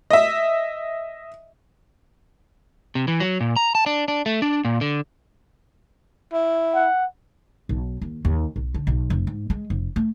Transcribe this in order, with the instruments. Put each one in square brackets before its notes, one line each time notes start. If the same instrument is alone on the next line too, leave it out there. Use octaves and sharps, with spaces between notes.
[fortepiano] D#5 E5
[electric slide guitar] C3
E3
F#3
A#2
A#5
A5
D4
D4
A3
D4
A#2
D3
[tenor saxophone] E4
[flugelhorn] F#5
[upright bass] B1
D#2
D#2
B1
D3
B1
F1
G#2
G#3
F1
A3